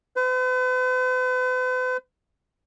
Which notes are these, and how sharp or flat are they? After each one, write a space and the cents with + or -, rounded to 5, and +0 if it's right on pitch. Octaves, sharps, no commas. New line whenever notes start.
B4 +45